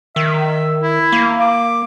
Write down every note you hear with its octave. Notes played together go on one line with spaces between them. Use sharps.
D#3 E5
E4
A#3
D6